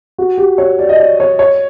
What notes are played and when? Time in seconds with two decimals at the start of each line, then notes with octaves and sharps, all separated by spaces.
0.18 F#4
0.38 G4
0.58 C#5
0.79 D5
0.89 D#5
0.99 D5
1.20 C#5
1.39 C#5